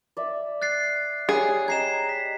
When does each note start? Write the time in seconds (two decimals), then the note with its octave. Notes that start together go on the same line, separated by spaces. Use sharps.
0.17 D5 E5
0.62 F#6 A6 C7
1.29 G3 G#4 C#5
1.68 D#5 G5 A#5 G#6 C7 E7
2.09 B6